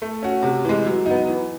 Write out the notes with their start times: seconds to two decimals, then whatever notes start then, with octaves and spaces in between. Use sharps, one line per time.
0.02 A3
0.23 C#4 F#4
0.43 C3
0.65 E3 G#3
0.86 F#3
1.06 B3 D#4
1.27 E3